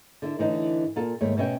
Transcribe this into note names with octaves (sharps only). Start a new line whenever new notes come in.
D3 E4
A2 D3 E3 D#4
A#2 F4 A4
D#2 G#2 A3 C#5
B2 C#4 E5 G5